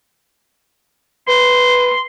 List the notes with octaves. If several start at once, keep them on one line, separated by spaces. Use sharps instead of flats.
B4 C6